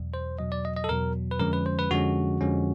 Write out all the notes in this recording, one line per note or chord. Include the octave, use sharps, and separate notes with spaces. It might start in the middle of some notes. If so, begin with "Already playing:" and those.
Already playing: E2 B2 F#3
C5
E2 B2 F#3 D#5
D5
D#5
D#5
A4
E2 B2 F#3 A#4
B4
F2 D3 F3 G#3 C#4 A#4
B4
C5
B4
F2 D3 F3 G#3 C#4 F#4
F2 D3 F3 G#3 C#4